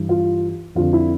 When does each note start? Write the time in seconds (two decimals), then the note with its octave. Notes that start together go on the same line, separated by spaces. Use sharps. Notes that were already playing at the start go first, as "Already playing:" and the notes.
Already playing: G2 E3
0.09 F4
0.75 F2 D3 F4
0.93 E4